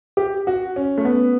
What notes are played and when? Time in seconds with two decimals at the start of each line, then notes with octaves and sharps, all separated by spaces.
0.17 G4
0.47 F#4
0.76 C#4
0.98 A3
1.05 B3